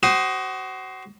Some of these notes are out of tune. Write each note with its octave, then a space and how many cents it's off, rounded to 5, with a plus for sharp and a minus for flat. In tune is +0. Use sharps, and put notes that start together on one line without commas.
F#4 +30 C5 +0 D#6 +0